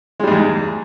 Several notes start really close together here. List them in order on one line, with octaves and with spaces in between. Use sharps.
G#3 G3 G#2 E2